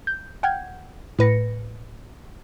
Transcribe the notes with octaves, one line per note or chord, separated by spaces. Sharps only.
G6
F#5 G5 F6 G6 G#6
A2 B4 A#6 C#7